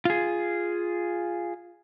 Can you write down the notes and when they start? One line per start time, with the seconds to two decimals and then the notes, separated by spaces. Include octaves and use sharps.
0.05 F4 G#4